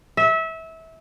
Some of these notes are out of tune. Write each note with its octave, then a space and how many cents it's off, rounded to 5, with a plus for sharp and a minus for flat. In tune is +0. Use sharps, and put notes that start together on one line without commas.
E5 -25